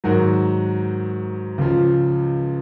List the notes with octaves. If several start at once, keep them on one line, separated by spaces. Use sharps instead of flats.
G#2 D#3 F#3 F#4
C#2 C#3 F3